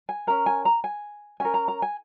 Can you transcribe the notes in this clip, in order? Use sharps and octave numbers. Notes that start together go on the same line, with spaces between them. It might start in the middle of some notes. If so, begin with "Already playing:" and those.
G#5
C#4 A#4 A#5
G#5
A#5
G#5
C#4 A#4 G#5
A#5
A#5
G#5